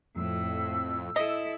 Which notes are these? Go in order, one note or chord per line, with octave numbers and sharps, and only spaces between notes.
F2 A2 E6
E4 A4 D#5